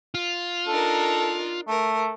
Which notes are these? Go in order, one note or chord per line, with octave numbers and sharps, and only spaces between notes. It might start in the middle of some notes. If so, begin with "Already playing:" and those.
F4
D4 D#4 A4 A#4
A3 A#4